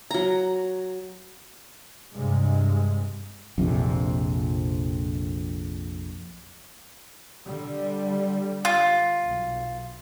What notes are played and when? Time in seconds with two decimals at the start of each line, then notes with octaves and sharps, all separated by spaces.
0.11 F#3 A#5
2.14 G2 C3 G#3
3.58 A#1 F2 C3
7.44 D3 G3
8.65 F4
9.21 B1